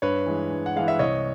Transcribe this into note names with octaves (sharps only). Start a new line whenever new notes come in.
G2 B4 C#5
E3 G#3
G2
F#5
E3 G#3 F5
E5
C2 C#5 D#5